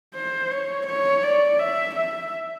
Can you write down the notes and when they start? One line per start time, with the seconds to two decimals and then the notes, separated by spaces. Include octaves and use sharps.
0.15 C5
0.51 C#5
0.87 C#5
1.23 D5
1.59 E5
1.95 E5